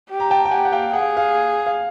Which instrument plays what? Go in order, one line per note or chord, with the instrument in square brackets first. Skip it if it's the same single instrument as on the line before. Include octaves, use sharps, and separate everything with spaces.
[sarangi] G4
[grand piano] A#5
G5 A5
G5
[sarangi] G4 [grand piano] F#5 G#5
[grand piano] F#5
F5 G5
[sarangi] G#4 [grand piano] F#5
[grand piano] F5
F5
F5